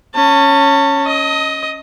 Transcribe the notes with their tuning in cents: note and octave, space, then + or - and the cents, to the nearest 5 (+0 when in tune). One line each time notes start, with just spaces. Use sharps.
C#4 +0 A5 +30
D#5 +10 D#6 +35